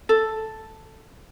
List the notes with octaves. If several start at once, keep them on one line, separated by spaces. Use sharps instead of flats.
A4